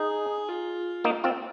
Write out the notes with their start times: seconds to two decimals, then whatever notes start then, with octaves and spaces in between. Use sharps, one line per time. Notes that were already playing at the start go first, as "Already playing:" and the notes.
Already playing: D#4 G#4
0.48 F4
1.04 A#3 D#4
1.24 C4 F4